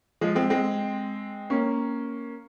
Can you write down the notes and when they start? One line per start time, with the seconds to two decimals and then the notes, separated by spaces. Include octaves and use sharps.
0.21 F3 G#3
0.35 G#3 C4
0.50 G#3 C4
1.50 A#3 C#4